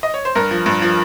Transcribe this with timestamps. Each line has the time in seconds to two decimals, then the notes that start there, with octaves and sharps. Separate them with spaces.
0.03 D#5
0.14 C#5
0.25 C5
0.35 G2 A#4
0.51 F3
0.66 G2
0.82 F3